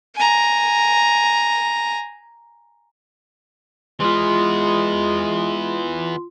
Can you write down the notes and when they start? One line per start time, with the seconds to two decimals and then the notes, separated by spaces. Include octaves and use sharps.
0.16 G#5 A#5
4.00 E3 G#3 B3 F4 C6